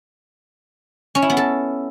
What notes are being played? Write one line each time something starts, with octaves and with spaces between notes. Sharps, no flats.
C#4
E4
B3
A4